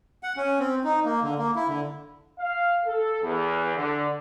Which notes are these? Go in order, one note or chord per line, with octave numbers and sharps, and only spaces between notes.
F#5
C#4
C4
D#4
A#3
D3
A#3
E4
D3
F5
A4
E2
D3